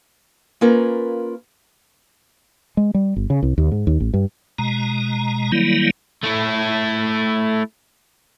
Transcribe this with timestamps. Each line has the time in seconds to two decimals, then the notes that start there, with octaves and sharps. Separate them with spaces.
0.61 A#3 C#4 F4 A#4 B4
2.77 G#3
2.94 G3
3.16 G1
3.30 C#3
3.43 C2
3.58 D#2
3.72 G#2
3.87 D#2
4.00 A1
4.14 G2
4.58 B2 G#3 A#5
5.52 D#3 F#3 G3 A#3 E4
6.23 A3 E4